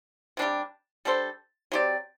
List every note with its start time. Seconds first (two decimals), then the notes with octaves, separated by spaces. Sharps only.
0.37 C3 G3 D4 G4
1.05 G3 D4 A4 C5
1.72 F#3 C4 G4 D5